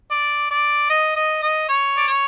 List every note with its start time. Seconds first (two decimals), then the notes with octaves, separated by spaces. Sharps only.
0.11 D5
0.51 D5
0.90 D#5
1.16 D#5
1.42 D#5
1.69 C#5
1.97 D5
2.07 C#5